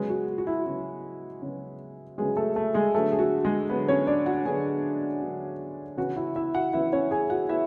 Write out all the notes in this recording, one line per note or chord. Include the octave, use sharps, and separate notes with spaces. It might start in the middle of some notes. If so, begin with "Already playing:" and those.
Already playing: C#3 F#3 G#3 B3 G#4
F#4
F#4
E4
C#3 F#3 B3 E4
C#3 F#3 B3
C#3 F#3 G#3 B3 G#4
A3 A4
A3 A4
G#3 G#4
D3 F#3 A3 B3 A4
G#4
F#4
G#3 G#4
D3 F#3 B3 B4
C#4 C#5
D4 D5
F#4 F#5
D3 F#3 B3 G#4 G#5
D3 F#3 B3
C#3 E3 B3 F#4 F#5
E4 E5
E4 E5
F#4 F#5
C#3 E3 B3 E4 E5
C#4 C#5
G#4 G#5
F#4 F#5
B3 E4 E5